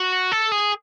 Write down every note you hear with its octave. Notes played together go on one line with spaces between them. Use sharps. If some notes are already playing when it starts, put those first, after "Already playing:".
Already playing: F#4
A4
G#4